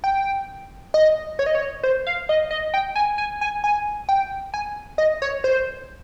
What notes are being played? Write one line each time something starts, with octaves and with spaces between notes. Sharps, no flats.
G5
D#5
C#5
D#5
C#5
C5
F5
D#5
D#5
G5
G#5
G#5
G#5
G#5
G5
G#5
D#5
C#5
C5